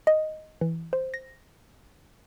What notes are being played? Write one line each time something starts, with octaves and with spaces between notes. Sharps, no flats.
D#5
E3
C5
A#6